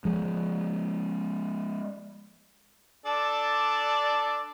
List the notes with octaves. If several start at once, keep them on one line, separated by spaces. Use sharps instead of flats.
F3 G#3
D4 A4 D5